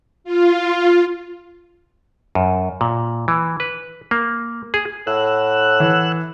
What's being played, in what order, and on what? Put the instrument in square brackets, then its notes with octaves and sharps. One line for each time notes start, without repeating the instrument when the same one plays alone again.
[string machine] F4
[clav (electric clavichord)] F#2
A#2
E3
B4
A#3
G#4
[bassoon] A2 [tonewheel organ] F#5 E6 F#6
[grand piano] E3